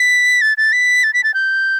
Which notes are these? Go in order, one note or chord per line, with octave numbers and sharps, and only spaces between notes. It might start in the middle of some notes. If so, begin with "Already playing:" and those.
Already playing: B6
A6
A6
B6
A6
B6
A6
G6